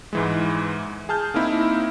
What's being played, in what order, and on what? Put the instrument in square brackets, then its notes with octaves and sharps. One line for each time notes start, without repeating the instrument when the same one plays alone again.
[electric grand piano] G#2 E3 G#3
G#4 A5 F6 G6
A#3 C4 D#4 E4